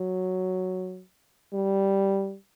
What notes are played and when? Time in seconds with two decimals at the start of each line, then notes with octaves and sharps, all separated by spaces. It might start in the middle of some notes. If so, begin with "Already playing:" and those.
Already playing: F#3
1.54 G3